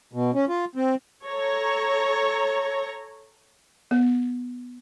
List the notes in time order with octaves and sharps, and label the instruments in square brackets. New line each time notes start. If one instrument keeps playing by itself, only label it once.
[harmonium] B2
C#4
F4
C4
[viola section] A4 C#5 A#5
[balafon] B3